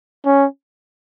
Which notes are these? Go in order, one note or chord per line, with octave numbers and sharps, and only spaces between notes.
C#4